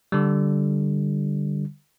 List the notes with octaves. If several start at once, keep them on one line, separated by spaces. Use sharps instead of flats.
D3 G3